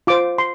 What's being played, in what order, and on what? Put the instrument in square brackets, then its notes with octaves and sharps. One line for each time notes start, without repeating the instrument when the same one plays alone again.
[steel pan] F4 C5 D6
C6